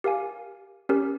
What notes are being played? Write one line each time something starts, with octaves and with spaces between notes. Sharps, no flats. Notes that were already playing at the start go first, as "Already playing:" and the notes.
G4 A#4 F5 G#5
C#4 G4 A#4